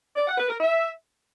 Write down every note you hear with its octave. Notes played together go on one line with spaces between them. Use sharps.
D5
F#5
B4
A#4
E5